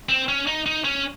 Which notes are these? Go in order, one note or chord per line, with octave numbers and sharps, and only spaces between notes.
C4
C#4
D#4
D#4
C#4